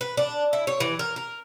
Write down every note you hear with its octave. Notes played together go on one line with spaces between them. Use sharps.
B4
D4
E4
C#5
E3
A#4
A#4